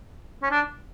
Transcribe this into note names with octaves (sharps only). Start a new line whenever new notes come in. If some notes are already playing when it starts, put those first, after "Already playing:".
C#4
D4